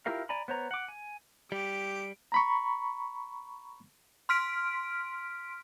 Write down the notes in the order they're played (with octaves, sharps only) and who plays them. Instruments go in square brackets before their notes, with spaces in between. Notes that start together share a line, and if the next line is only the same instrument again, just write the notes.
[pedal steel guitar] E4 F4 G4 A#4 F5
D5 G#5 A#5 B5
B3 C5 C#5 A#5
F#5 D6
G#5
[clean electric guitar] G3 [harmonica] G4 [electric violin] D7
[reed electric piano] A#5 B5 C#6
[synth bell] C6 F6 B6 D7